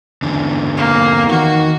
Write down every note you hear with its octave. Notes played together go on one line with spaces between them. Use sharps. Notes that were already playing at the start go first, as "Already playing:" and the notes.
E2 D3
A#3
D#3 F#4